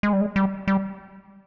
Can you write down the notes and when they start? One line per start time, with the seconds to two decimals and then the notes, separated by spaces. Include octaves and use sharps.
0.03 G#3
0.13 G3
0.21 G#3
0.36 G3
0.68 G3